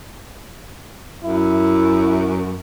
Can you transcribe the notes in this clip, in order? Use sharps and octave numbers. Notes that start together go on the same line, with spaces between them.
F#2 E4